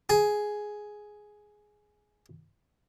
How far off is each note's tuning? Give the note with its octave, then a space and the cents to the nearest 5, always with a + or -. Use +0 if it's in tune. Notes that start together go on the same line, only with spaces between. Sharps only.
G#4 +5